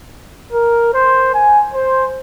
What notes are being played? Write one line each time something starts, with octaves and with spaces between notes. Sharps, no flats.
A#4
C5
G#5
C5